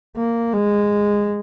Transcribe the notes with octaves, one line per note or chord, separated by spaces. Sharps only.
A#3
G#3